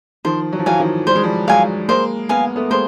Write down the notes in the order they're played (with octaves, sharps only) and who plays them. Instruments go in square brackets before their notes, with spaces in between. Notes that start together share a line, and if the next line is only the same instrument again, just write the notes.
[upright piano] D#3 F3 [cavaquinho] C5
[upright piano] F#3
F3
[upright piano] E3 F#3 [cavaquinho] F5 G#5
[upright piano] D#3 F3
[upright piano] G3 [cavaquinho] C5
[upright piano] G#3
F3 G3
[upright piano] F#3 G#3 [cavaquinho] F5 G#5
[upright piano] G#3 A#3 [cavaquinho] C5
[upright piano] B3 [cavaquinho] F5 G#5
[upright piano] A3 B3
[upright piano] G#3 A#3 [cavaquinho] C5